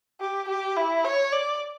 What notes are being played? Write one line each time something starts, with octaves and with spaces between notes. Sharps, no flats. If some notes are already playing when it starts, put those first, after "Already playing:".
G4
G4
E4
C#5
D5